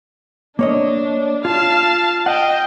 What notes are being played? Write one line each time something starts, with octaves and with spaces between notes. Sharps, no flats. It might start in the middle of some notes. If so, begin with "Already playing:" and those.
A#3 D4 C#5 D#5
F4 F5 A5
D#5 F#5 G5